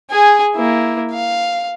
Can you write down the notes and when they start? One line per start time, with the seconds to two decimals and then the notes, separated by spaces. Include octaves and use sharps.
0.10 G#4 G#5
0.55 A#3 E4
1.12 F5